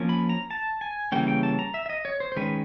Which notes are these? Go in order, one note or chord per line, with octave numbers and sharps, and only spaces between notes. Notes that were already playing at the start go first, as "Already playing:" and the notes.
Already playing: F3 A#3 C#4
B5
A#5
A5
G#5
C#3 E3 G3 A#3 C#4 G5
G5
A5
A#5
E5
E5
D#5
C#5
C5
C5
D#3 G#3 C#4 B4